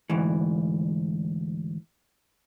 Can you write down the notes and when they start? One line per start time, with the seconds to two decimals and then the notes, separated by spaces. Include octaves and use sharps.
0.10 D2 G#2 E3